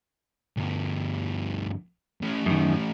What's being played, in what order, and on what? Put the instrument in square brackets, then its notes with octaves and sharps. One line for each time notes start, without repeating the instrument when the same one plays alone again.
[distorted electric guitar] D2 G2
A2 C#4
[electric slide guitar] F#2 D#3